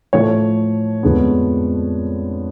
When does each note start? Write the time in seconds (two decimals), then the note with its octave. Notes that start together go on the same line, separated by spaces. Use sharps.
0.13 A2 F3 A3 C#5
1.03 F2 D3 G#3 B3